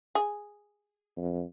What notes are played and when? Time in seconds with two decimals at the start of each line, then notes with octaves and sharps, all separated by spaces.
0.15 G#4
1.17 F2